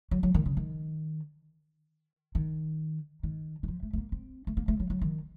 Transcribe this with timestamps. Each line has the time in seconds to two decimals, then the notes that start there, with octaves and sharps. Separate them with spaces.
0.11 F#3
0.23 F#3
0.34 D#3
0.46 C#3
0.57 D#3
2.35 D#3
3.23 D#3
3.63 D#3
3.68 F3
3.83 A3
3.93 A3
3.98 A#3
4.12 C4
4.47 A3
4.57 A#3
4.68 A3
4.80 F#3
4.90 F#3
5.02 D#3